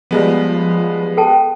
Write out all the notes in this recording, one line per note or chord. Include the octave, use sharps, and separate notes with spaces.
F3 G3 G#3 B3
A4 G5 A5